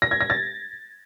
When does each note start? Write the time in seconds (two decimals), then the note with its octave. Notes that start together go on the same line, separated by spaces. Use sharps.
0.02 A#6
0.11 G#6
0.21 A#6
0.30 A6